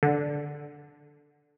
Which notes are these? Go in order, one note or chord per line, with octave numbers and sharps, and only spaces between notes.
D3